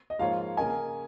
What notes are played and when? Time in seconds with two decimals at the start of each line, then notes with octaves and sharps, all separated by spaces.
0.10 D#5
0.19 G#2 F3 A#3 F4 C#5 F5
0.57 C#3 A#3 C#4 A#4 D#5 G#5